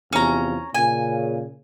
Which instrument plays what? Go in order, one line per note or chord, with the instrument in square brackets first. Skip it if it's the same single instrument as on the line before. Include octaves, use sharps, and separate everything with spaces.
[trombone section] E2 C3 F3 [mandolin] C#4 A#5
[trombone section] A#2 C#3 [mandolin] G#5